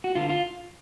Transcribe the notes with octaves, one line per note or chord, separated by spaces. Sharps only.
F#4
D3 F4
F4